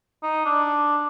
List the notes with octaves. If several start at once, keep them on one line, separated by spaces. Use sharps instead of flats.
D#4
D4